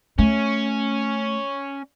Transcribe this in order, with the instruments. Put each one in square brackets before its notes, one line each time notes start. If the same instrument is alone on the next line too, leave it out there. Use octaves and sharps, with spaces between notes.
[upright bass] A3 [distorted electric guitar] C#4